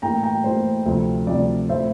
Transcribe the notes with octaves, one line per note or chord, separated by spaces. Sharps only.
A2 E3 A#3 G5 A#5
G5 A#5
A2 E3 A#3 C5
D2 C3 F3 C4
D2 C3 F3 C4 D5
A2 F3 C4 C5 E5